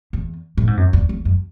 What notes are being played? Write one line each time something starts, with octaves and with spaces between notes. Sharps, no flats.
E2
A2
G#2
F#2
E2
E2
F#2